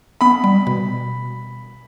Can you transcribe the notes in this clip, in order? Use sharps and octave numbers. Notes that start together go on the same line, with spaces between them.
B3 B5
G3
B2